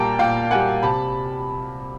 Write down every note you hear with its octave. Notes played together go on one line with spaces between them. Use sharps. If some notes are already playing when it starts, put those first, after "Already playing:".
Already playing: A#2 G3 A#3 G5 A5 A#5
A#2 F5 G5
G3 A#3 F#5 G#5
C3 A5 B5